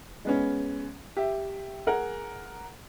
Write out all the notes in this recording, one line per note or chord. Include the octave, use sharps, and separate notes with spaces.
G#3 B3 C#4
G4 E5
G#4 A#4 F#5